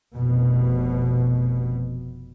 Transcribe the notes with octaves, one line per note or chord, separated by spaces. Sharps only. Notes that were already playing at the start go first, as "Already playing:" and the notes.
F1 B2